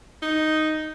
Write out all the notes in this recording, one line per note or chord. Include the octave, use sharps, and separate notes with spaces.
D#4